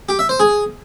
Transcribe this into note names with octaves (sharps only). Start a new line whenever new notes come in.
G4
E5
C5
G#4